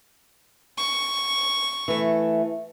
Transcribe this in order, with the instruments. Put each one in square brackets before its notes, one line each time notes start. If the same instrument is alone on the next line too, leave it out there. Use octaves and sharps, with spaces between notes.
[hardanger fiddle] C#6
[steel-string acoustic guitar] E3 A3